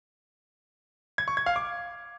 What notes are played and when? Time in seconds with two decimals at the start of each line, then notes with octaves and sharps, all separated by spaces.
1.18 G#6
1.28 C#6
1.37 G#6
1.46 F5
1.56 D6